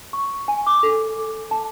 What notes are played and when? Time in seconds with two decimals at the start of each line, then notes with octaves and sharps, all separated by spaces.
0.13 C#6
0.48 G#5
0.67 D6
0.83 A4
1.51 A5